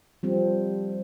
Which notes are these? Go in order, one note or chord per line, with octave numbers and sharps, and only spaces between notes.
F3 G3 C4